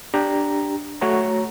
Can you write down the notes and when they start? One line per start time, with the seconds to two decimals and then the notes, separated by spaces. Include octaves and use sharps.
0.14 D4 G4 A#5
1.01 A3 F#4 C#5 A#5